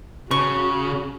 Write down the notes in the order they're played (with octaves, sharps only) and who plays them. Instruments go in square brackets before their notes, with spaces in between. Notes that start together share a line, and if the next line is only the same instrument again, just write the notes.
[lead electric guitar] C#3 [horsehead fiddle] F#4 [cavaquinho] C#6